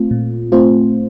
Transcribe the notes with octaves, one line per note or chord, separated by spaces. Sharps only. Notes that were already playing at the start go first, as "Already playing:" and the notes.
Already playing: A3 C4 F4
A#2
A3 C4 F4 C5